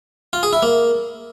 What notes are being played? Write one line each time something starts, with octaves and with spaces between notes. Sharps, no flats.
F4
G#4
E4
A#3